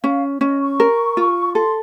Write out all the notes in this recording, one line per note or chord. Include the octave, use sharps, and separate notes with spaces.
C#4 F5
C#4 D#5
C#6
A#4
F4
A4 C6